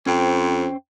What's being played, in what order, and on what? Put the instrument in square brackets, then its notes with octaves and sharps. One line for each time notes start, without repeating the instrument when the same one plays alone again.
[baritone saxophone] F2 [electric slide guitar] C#4 C5 G5